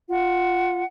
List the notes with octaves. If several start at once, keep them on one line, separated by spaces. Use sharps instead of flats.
F4 F#5